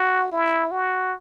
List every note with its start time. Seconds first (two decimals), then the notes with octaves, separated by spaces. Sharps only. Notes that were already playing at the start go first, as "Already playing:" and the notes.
Already playing: F#4
0.32 E4
0.71 F#4